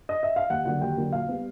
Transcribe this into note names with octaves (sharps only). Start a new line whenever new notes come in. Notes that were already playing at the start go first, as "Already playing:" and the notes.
D#5
E5
F5
D#2 F#5
D3 F#3 A#3 F#5
D#2 G5
D3 F#3 A#3
A#2 F5
G3 B3